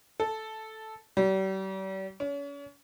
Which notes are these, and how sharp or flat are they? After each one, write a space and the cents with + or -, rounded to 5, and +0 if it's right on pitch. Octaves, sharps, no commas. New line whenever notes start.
A4 -5
G3 -40
C#4 +35